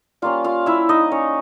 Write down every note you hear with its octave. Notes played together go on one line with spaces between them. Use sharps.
G3 A#3 C#4 F4 F5
F4 F5
E4 E5
D#4 D#5
C#4 C#5